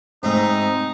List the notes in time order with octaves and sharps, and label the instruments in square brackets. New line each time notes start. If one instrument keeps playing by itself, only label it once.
[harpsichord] G#2 A3 [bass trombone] C4 [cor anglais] D#4